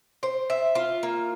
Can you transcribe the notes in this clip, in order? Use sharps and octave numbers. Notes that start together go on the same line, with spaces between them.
C5
E5
F4
A#3